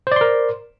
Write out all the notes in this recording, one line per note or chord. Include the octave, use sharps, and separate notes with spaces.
A#4 C5 D5 C6